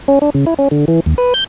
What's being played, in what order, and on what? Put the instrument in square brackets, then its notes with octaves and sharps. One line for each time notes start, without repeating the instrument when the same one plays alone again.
[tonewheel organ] C#4
D4
C#3
E4
C#4
D3
E3
D#2
B4
G6